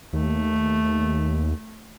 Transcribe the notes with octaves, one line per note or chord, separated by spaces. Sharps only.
D#2 A3